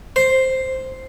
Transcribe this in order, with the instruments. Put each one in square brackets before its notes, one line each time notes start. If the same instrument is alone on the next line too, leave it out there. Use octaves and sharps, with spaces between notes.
[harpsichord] C5